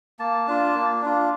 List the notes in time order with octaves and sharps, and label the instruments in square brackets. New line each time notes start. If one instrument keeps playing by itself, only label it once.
[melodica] A#3 A5
D4 F4
A#3
D4 F4